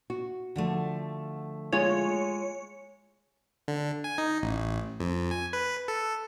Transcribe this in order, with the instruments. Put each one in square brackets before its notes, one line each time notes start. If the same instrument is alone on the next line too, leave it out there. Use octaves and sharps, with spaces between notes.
[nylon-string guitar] F#4
[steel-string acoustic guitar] D3 F3 A3
[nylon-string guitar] G#3 F4 G#4 [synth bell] C#5
[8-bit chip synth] D3
G#5
D#4
A1
F2
G#5
B4
A4